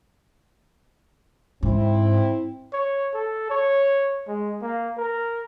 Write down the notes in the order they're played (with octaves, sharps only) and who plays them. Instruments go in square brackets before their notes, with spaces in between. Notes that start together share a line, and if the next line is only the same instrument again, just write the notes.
[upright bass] G#2 [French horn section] C4 E4
[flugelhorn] C#5
A4
C#5
G#3
A#3
A#4